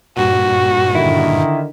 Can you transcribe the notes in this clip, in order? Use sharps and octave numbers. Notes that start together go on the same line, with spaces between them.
G2 A#2 F#4
D3 D#3 E4